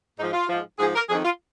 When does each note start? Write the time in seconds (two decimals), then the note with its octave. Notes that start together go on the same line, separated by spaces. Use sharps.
0.18 G#2 F3 D#4
0.33 F4
0.49 G#2 F3
0.79 G#2 F3 G#4
0.95 A#4
1.10 F2 D#3 G#4
1.25 F4